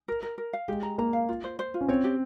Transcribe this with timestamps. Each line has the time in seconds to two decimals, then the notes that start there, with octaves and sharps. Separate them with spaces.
0.08 A#4
0.23 A#4
0.38 A#4
0.53 F5
0.68 G#3 G4
0.83 A#5
0.98 A#3 A#5
1.13 F5
1.29 F4
1.44 C5
1.59 C5
1.74 F4
1.81 C#4
1.88 C4 C#5
2.04 G4